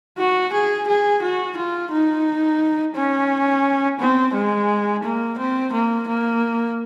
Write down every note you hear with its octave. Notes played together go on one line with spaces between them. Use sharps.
F#4
G#4
G#4
F#4
F4
D#4
C#4
C4
G#3
A#3
C4
A#3
A#3